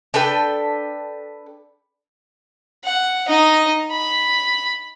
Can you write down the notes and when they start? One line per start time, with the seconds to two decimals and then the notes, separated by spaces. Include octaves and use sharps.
0.14 D4 A4 B4 G5
2.85 F#5
3.28 D#4 D#5
3.92 B5